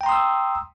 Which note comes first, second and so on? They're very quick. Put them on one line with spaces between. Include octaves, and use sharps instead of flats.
G5 A#5 C6 D#6 E6